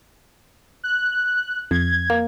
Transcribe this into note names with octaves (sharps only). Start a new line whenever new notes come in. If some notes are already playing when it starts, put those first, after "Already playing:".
F#6
F2 G#6
A#3